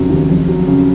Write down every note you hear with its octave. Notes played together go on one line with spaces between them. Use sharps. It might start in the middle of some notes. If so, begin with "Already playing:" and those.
Already playing: F1 C#3 F#3 C4
D#2
F2
F#3
C#3